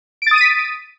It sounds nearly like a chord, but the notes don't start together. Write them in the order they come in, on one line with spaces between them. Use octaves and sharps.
D7 A6 D#6 D#7 B6